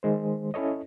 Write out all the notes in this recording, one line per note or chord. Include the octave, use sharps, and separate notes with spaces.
D#3 G#3 C5
C#4 E4 A4 C#5 D#5